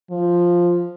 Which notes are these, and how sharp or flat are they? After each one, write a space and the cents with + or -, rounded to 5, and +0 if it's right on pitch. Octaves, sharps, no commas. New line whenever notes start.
F3 +0